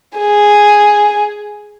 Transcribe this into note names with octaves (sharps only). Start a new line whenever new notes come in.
G#4